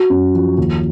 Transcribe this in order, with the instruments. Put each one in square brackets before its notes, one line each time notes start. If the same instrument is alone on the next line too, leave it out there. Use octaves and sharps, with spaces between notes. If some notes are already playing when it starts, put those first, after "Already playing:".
Already playing: [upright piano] F#4
F#2
F3
D#2